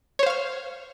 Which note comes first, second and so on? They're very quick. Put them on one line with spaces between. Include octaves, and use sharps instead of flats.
C#5 C5 F5 F6